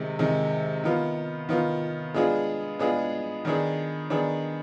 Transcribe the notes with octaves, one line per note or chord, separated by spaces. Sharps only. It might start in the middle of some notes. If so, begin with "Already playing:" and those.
Already playing: C3 D#3 G#3
C3 D#3 G#3
D#3 B3 F4
D#3 B3 F4
G#3 B3 D4 F4 G#4
G#3 B3 D4 F4 G#4
D#3 B3 D4 G#4
D#3 B3 D4 G#4